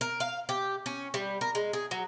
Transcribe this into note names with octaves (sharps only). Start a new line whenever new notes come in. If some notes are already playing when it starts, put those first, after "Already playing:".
A#4
F5
G4
C#4
G3
A#4
G#3
G#4
F#3